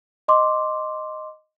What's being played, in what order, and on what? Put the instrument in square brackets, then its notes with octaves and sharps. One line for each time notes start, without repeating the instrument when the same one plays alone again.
[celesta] D#5 C6 D6